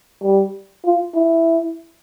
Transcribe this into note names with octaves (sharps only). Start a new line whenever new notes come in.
G3
F4
E4